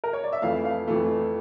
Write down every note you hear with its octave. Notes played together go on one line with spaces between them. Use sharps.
A#4
C#5
D5
E5
F2 E3 A3 F5
F5
F2 E3 A3